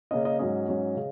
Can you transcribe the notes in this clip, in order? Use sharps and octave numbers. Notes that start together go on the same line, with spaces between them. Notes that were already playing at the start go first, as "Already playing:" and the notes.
C#3 A#3 C#4 D#5
D#5
G#2 F#3 C#4 D#5
G#2 F#3 C#4
C#3